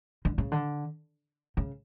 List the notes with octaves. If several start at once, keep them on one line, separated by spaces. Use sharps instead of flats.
D3
C#3
D3
C#3